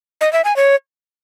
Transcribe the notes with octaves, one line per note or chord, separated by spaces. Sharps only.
D#5
E5
G#5
C#5